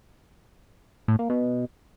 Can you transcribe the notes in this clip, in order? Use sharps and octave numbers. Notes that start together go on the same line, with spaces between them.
A2
A#3
B2